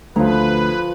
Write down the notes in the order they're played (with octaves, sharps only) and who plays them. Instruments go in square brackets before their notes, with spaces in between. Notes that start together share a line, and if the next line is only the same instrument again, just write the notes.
[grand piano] D2 [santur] F3 A#5 [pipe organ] B4